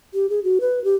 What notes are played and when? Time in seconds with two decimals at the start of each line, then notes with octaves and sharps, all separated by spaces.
0.14 G4
0.30 G#4
0.44 F#4
0.61 B4
0.84 G4